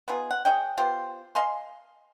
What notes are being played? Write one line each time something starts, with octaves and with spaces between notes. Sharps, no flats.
B3 D#4 F4 G#4
F#5
G#4 C#5 D#5 G5
B3 F4 G4 C5
D#5 F5 G#5 C6